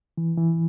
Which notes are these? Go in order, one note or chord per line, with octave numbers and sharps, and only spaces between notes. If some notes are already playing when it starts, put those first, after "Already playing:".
E3
E3